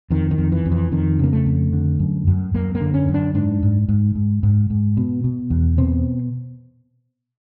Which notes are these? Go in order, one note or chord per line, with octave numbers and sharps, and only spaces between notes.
F2 D#3
D#3
F2
E3
F2
E3
F2 D#3
C#3 A#3
A3
F2
D3
F#2
F#2
F#2 A#3
A#3
D3
C#4
F#2
D4
G#2 D4
G#2
G#2
G#2
G#2
G#2
B2
B2
E2
B2 C4